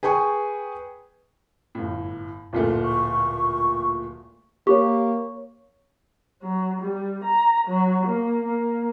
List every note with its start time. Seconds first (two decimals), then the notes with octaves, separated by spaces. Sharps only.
0.03 G#4 B4 G5 G#5 C#6
1.75 G1 A2
2.53 D1 A#2 A3
2.85 C#6
4.67 A#3 G4 C#5 C#6
6.42 F#3
6.80 G3
7.23 A#5
7.67 F#3
8.05 A#3
8.43 A#3